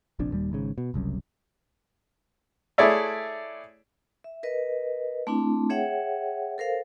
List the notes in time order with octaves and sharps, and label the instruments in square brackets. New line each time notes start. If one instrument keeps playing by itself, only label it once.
[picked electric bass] F1 A#1 F2 D4
D#1 D#2 G3
G#1 G#2 C#3
B2
F#1 C2 F#2
[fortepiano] A3 E4 G#4 C#5 D5 E5
[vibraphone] E5
A#4 B4 D#5
A3 C4 D4 E4
G#4 C#5 E5 F#5 G5
A4 A#4 C5 F5